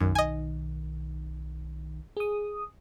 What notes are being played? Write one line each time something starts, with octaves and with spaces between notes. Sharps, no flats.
B1 F#2 D#3
D#5 G#5
G#4 D#6